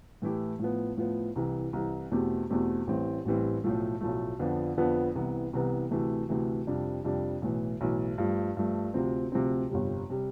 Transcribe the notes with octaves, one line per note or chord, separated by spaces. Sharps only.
A2 E3 A3 E4 G4
A2 F3 B3
A2 F3 B3
C2 C3 E3
C2 C3 E3
E2 B2 A3 C4 G4
E2 B2 A3 C4 G4
A1 A2 E3 G3 C4
A1 A2 E3 G3 C4
B1 A2 F3 A3
B1 A2 F3 A3
F2 D3 F3 B3 D4
F2 D3 F3 B3 D4
C2 C3 E3 B3
C2 C3 E3 B3
D2 C3 E3 A3
D2 C3 E3 A3
F2 C3 G3 D4
F2 C3 G3 D4
B1 A2 E3
B1 A2 E3
G2 F3 A3
G2 F3 A3
D2 C3 F3 C4
D2 C3 F3 C4
G1 F2 C3 G3
C3 G3